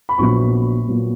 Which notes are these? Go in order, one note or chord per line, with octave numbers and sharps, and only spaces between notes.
B5
A#1 A#2 F#3 B3 C#6
A#2 F#3 B3